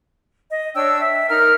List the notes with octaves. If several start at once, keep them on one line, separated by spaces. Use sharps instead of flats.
D#5
D4 C#5 G5 E6
E5
D#4 A#4 A#5 F6